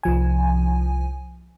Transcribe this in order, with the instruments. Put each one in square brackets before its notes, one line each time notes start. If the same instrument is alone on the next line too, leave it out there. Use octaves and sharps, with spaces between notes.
[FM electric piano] C2 F3 G#5